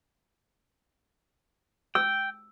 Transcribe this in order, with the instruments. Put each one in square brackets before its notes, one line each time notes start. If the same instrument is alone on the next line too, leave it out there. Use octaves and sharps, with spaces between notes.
[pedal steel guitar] G5 [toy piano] E6